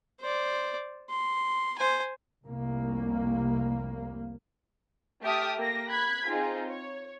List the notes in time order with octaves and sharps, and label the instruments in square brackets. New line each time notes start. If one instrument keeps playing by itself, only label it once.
[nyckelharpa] C5 D5
C6
C5 G#5
[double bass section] F1 C2 A#3
[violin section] A3 G4 E5 A5 D#6 F6
A#3 G4 A#6
B5 F#6 G#6 B6
C4 D#4 F4 G#4
C#5